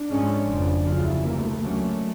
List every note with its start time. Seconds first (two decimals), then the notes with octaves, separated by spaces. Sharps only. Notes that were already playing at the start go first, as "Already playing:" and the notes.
Already playing: D4
0.11 G#2 F3 G#3 C#4
0.48 F#1 F2 C#3 F3
0.86 D2 C#3 F#3 A3 F4
1.05 E4
1.25 D2 C3 E3 A#3
1.37 A3
1.50 A3
1.62 D2 D3 F#3 A3 A#3 C#4